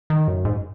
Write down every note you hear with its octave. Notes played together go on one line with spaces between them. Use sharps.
D#3
F#2
G#2